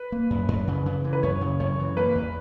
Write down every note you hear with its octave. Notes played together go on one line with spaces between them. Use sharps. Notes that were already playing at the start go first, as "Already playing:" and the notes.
Already playing: B4
A#3
F#2
F#2
C#3
C#3
E3
B4
F#2 C#5
C#3
F#2 C#5
E3
A#3 B4
E2